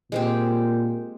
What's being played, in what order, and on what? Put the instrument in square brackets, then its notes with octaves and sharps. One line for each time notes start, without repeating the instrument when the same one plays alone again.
[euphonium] A#2 [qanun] G#3 C4 G4